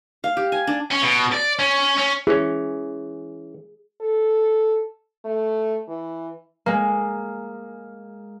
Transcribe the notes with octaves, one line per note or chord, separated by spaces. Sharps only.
F5
G4
G#5
D4
C#4
B2
D5
C#4
C#4
E3 C#4 G#4
A4
A3
E3
G#3 A#3